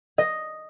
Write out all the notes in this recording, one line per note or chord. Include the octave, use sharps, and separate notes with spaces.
D#5